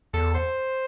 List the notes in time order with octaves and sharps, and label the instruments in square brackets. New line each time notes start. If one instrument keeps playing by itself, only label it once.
[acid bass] E2 [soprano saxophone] A4
[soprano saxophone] C5